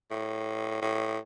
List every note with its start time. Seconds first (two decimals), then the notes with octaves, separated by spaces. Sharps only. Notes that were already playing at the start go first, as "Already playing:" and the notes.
0.11 A2
0.81 A2